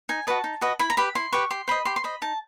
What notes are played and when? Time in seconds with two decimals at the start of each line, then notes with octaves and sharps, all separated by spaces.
0.09 D#4 G#5
0.27 F#4 B4 D#5 A5
0.44 D#4
0.61 F#4 B4 D#5
0.79 E4 B5
0.90 A#5
0.97 G4 B4 B5
1.15 E4 C6
1.32 G4 B4 C#6
1.50 G4 C6
1.68 C5 D#5 B5
1.85 G4 C6
1.96 C6
2.04 C5 D#5 B5
2.22 D#4 A5